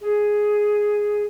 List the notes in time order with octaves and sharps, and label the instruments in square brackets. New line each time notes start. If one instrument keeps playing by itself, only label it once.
[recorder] G#4